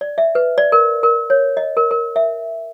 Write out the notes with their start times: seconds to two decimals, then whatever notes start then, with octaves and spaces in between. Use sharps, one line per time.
0.01 D5
0.18 E5
0.35 B4
0.58 D5
0.72 A#4
1.03 A#4
1.30 C#5
1.57 D#5
1.77 A#4
1.91 A#4
2.16 E5